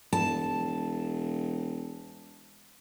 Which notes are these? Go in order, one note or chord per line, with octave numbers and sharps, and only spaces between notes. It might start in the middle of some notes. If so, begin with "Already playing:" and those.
E1 A5